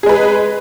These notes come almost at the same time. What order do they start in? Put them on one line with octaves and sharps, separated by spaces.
G#4 G#3 B4